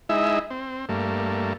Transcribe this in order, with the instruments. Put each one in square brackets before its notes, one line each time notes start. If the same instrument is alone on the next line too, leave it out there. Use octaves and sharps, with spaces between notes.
[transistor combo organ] G#3 D#4 E4 E5
C4
G2 A3 A#3